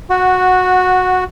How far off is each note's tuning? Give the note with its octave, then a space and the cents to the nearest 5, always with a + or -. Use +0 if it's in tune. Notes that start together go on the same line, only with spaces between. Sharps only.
F#4 -10 F#5 +0